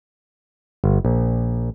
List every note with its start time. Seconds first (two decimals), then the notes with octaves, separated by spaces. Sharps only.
0.84 G1
1.05 A#1